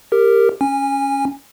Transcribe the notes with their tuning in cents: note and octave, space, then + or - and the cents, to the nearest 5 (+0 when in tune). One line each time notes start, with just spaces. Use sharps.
G4 +15 A#4 -10
C#4 +0 G#5 -20